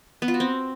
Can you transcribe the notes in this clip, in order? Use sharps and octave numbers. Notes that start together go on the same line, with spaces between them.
B3
F4
F#4
C4